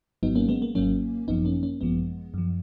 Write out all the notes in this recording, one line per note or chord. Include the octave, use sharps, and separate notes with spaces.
G#1 G#2 F#3 B3 D#4
A#3 C#4
G#3 B3
A#3
G#1 G#2 F#3 A#3 C#4
G#1 F#2 F3 B3 D#4
A#3 C#4
A#3 C#4
G#1 F#2 F3 G#3 B3
F#2 F3